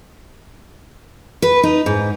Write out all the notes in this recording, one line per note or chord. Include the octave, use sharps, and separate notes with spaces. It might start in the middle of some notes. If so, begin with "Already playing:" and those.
B4
D#4
G#2